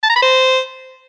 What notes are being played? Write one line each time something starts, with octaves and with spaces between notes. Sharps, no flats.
A5
A#5
B5
C5